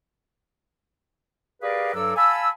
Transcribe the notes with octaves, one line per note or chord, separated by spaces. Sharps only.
G4 G#4 A#4 B4 D5 F5
G2 F#3 A4 D5 E6
F5 G#5 A5 B5 E6